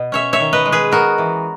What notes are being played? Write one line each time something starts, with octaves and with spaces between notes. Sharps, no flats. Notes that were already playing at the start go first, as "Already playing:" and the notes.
Already playing: B2
C#4 C#5 E5
C#5 E5
D#3
B4 D#5
G#3
G#4 B4
B3 F#4 A#4
E3